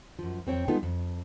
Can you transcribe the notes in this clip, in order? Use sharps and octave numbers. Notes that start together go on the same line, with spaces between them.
F#2 F3
F2 C4 C#5 G5
G3 G#3 B3 D#4 F4 A4
F2